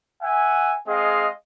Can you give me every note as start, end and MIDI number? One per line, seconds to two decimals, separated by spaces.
0.22 0.74 76
0.22 0.74 78
0.22 0.74 80
0.88 1.29 56
0.88 1.29 60
0.88 1.29 68
0.88 1.29 75
0.88 1.29 77